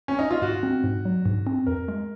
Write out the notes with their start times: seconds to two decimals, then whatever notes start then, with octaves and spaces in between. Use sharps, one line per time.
0.08 C#4
0.19 D#4
0.31 F4
0.42 G#2 F#4
0.63 C4
0.84 G#2
1.05 F#3
1.26 G#2
1.47 C4
1.67 F2 A#4
1.88 G#3